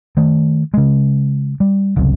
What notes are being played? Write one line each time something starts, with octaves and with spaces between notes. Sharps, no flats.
D#3 A3
C#3 G#3
G3
F#1 C#2 F#2 C3